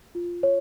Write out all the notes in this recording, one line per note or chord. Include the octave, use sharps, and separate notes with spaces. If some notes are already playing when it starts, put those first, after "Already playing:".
F4
C#5